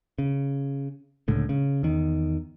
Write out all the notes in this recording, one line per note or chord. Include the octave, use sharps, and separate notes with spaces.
C#3
C#2 A2 D3
C#3
E2 D#3